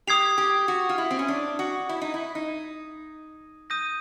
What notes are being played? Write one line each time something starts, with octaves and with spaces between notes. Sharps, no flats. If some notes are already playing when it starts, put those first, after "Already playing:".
G4 D#6 G#6 C7 F7
G4
F#4
F4
E4
C4
C#4
D4
F#4
E4
D#4
E4
D#4
D#6 G6 A#6 D#7